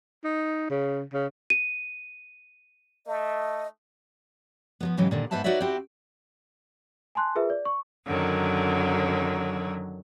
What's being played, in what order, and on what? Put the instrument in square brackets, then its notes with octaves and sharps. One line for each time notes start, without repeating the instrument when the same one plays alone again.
[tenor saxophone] D#4
C#3
C#3
[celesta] D#7
[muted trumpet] A3 [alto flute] D#5
[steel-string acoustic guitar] F3 F#3 B3
G#2 C#3 E3 F#3 D#4 G4
A#2 D3 D#3
G#2 B3 B4 C5 E5 A5
D#4 F#4 B4 C#5 D5 E5
C4 E4 F#4 G4
[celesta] G#5 A5 C6 F#6
F4 G#4 A#4 B4 E5
D5
C#6
[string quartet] F#2 D3 D#3 F#3